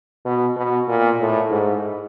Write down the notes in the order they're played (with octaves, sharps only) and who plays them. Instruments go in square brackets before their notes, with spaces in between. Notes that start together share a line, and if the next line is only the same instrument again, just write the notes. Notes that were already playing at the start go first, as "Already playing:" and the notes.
[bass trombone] B2
B2
A#2
A2
G#2